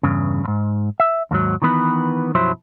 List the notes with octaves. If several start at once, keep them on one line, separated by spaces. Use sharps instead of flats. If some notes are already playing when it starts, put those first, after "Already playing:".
E2 G2 C#3
E2 G#2
E5
D#2 G#2 F#3
D#3 E3 B3 B4
B1 F#2 F3 F#3 E4 C5